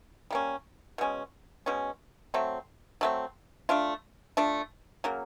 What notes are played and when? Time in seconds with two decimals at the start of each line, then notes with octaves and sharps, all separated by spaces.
0.31 G3 A#3 C#4
0.98 B2 G#3 C#4
1.66 B2 G#3 C#4
2.34 F#3 A3 C4
3.01 F#3 A3 C4
3.69 A3 D4 F4
4.37 A3 D4 F4
5.04 C#3 F#3 A#3